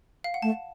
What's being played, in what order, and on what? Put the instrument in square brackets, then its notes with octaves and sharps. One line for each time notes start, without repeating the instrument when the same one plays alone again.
[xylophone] F5
F#5
[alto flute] A3 [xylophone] A5